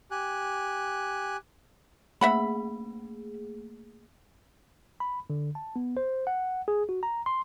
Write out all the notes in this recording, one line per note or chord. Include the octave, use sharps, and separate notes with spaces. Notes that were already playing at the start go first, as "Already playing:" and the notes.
G4 G#5 F#6
A3 A#3 G#4 E5 F#5 B5
B5
D3
A5
B3
C5
F#5
G#4
F#4
A#5
C6